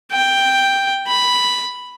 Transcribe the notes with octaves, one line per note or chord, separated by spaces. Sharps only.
G5
B5